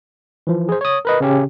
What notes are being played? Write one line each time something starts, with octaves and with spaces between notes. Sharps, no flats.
E3 F3
G#4 C5
C#5 D#6
A#4 B4 D#5
C#3 C#4 G4